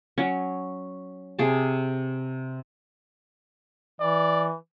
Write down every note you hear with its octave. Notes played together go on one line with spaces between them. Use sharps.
F#3 C#4
C3 G#4 A5
E3 D5